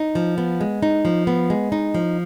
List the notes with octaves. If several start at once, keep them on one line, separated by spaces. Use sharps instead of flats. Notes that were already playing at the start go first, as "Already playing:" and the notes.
Already playing: D#4
F3
B3
G#3
D#4
F3
B3
G#3
D#4
F3